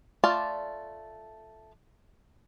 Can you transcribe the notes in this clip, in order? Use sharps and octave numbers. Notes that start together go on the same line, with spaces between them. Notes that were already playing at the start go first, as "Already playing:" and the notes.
A3 F4 D5 A5